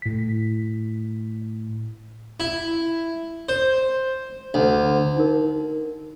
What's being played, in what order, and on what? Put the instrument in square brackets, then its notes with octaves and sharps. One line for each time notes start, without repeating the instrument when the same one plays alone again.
[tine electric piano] A2 B6
[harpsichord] E4
C5
D2
[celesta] D#4 A#4